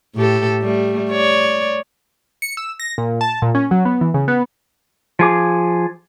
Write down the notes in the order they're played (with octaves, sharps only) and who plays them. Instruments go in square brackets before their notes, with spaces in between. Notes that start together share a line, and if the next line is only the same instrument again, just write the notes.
[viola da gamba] A2 G4 A4
G3 A3
C#5 D5
[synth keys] C#7
E6
A#6
A#2
A5
A#2
C#4
F#3
B3
E3
C#3
B3
[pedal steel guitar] F3 G#4 D6